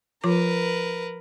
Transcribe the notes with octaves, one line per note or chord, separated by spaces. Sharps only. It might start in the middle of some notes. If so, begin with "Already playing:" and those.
F3 F4 A#4 B4 D6